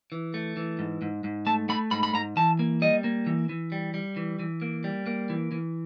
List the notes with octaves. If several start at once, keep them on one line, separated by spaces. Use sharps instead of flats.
E3
A3
E3
G#2
G#2
G#2
A3 A5
A3 B5
G#2 B5
B5
G#2 A#5
E3 A5
A#3
G3 D#5
A#3
E3
E3
G3
G3
E3
E3
A#3
G3
A#3
E3
E3